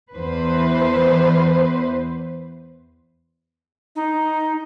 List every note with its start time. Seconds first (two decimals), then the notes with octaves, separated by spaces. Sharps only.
0.14 E2 B4 C5
3.96 D#4